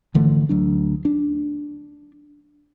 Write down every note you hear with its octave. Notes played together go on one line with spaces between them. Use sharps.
G#1 D3 E3 A3
D2 F#3 D4
D4